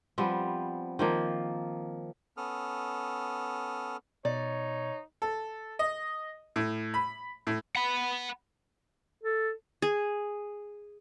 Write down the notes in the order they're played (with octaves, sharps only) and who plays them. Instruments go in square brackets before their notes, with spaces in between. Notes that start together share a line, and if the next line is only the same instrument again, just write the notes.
[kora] F3 G3 B3 C4
D#3 F3 A#3
[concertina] B3 C#4 A4 D#6 F6
[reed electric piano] B2 [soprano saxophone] D#4 [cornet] C#5 [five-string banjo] D5
[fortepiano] A4
D#5
A2
B5
A2
[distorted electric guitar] F#5 B5
[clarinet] A4
[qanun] G#4